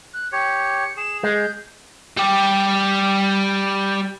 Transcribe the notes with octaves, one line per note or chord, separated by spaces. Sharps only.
F#6
G4 C#5 C#7
G#4 E7
G#3 G6
G3 G4